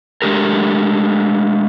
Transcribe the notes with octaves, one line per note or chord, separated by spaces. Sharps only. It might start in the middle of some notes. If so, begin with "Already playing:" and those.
G#3 A3 D4 G4 A#4